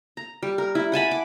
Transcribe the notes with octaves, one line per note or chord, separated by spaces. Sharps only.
A#5
G3
A#4
E4
F#5 G#5 A5 B5
D6